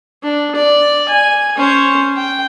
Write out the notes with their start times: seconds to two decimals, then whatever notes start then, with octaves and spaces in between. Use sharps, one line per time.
0.23 D4
0.55 D5
1.08 G#5
1.57 C#4 C5
2.16 G5